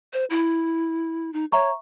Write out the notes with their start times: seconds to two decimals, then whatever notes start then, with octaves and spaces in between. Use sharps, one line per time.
0.13 C5
0.30 E4
1.33 D#4
1.52 C#5 E5 A#5 C#6